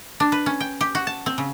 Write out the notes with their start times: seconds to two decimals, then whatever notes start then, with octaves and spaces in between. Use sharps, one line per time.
0.20 D4
0.32 B4
0.46 C#4
0.60 G5
0.81 G4
0.95 F#4
1.07 A5
1.26 C4
1.38 C#3